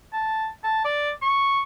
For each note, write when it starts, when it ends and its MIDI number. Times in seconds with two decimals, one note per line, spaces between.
0.13 0.47 81
0.64 0.82 81
0.85 1.10 74
1.22 1.62 85